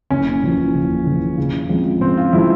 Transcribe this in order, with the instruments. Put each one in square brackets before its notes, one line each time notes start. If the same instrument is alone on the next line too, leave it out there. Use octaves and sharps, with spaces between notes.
[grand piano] F#1 [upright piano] C#4
[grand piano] E2 C#3 F3
F#1
E2 C#3 F3
C#3
F3 G#3 C4
[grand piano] C#3 [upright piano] C4
[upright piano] F4
[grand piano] F3 G#3 C4 [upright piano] E4